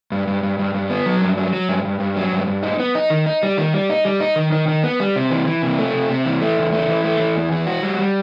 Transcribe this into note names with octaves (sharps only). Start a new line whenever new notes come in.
G2
G2
G2
G2
G2
B3
F#3
G2
F#3
F#3
G2
G2
G2
F#3
G2
G2
D#4
B3
D#4
D#3
D#4
G3
D#3
G3
D#4
G3
D#4
D#3
D#3
D#3
B3
G3
C3
E3
E3
C3
A3
C3
C3
E3
A3
E2
A3
E3
A3
E3
E2
E3
F#4
G3
G3